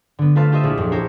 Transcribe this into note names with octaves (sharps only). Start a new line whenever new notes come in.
D3 B3
A3 F4 B4 C5 F5 A5
F4 G4 C5 D#5 E5
A#1 E4
F2
E4 G4 A#4 C5 C#5